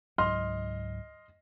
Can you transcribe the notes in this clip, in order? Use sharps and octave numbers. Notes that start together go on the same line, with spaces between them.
C#2 G#2 F#3 D#5 C6 F6